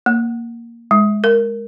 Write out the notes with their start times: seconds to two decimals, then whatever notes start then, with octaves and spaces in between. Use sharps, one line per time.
0.06 A#3
0.91 G#3
1.24 A#4